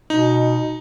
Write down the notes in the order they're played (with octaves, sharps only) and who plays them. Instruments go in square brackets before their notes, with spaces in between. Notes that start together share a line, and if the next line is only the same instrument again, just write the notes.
[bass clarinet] B2 [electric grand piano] D#4